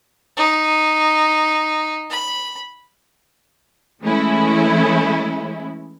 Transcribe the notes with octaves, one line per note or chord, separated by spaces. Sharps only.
D#4
B5
E3 G#3 A3 C#4 E4